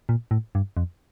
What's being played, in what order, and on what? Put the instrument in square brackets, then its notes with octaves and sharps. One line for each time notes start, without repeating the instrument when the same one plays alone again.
[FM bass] A#2
A2
G2
F2